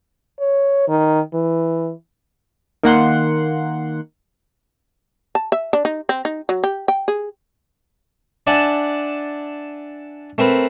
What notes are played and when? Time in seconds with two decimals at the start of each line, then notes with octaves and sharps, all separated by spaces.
0.39 C#5
0.88 D#3
1.34 E3
2.83 D#3 A#3 F#5 C6
5.35 A5
5.52 E5
5.73 D4
5.85 D#4
6.09 C4
6.25 D#4
6.49 F#3
6.64 G4
6.88 G5
7.08 G#4
8.47 D4 D5 E5 F#5 G#5 A5
10.38 A3 C4 A#4 B4